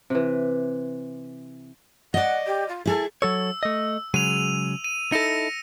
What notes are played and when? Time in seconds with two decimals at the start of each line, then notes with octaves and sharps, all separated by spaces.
0.10 C3 E3
2.14 D5 D#5 F#5
2.46 G4
2.68 F4
2.86 E4 G#4 A4
3.22 F#3 A4 C#5 E6
3.63 A3 D#5
4.14 C#3 F#3 G#3 D#7 F7
4.84 D#7
5.12 D#4 E4 A4 A#6 C#7